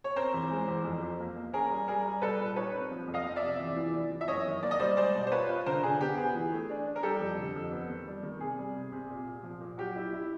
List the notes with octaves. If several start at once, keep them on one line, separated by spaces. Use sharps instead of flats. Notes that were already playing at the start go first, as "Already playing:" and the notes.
C#5
C4 A#4 C5
E2
G#3
E2
F2
F2
A#3
A#3
C#4 G#4 A#4
G3
G3 G#4 A#4
G3
G3 A4 B4
A#2
D#4 B4 C#5
C4
F3
F2
D#5 F5
F3
D5 E5
C3
E2
E3
E3
E3
E5
F#2 C#5 D#5
D#3
A#3 D5
D#5
G3 C5 D5
G#3 C5 D5
B2
C5
F4 B4 C#5
F4
D3 A#4 C5
D3 G#4
B3 G4
B3 G#4
E3
A3
D4
D4
A#4
G3 G4 A4
F2
D3
F2
B3
D#3
G3
D#3
C3 G#4
G3
C3
C3
A#2
A#2
F3
A#2
F#3 G4
E4
E4